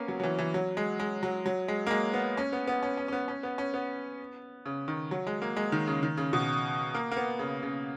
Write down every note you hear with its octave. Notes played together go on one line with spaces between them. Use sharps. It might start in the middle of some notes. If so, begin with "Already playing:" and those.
Already playing: A#3 B3 C#4
F#3
F#3
E3
E3
F#3
G#3
G#3
F#3
F#3
G#3
A#3
G#3
B3
C#4
B3
B3
C#4
C#4
C#4
B3
C#4
B3
C#4
B3
C#3
D#3
F#3
G#3
A#3
G#3
D#3
C#3
D#3
C#3
B2
A#3
A#3
B3
C#3
C#3